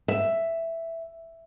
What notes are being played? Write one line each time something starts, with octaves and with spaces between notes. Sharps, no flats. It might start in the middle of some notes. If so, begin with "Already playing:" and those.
E5